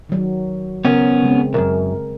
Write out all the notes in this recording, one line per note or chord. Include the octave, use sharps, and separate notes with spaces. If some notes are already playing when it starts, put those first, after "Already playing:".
D#3 F#3
C#3 B3 C#4 A#4
C#3 G#3 C4
C2 F#2 A#4